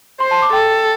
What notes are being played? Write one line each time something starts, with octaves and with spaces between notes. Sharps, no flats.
C5 C6
A5
D6
A4 G5